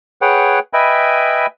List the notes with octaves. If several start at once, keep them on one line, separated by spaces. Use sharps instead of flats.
G#4 B4 C#5 F#5 G5
B4 D#5 E5 G5 G#5 B5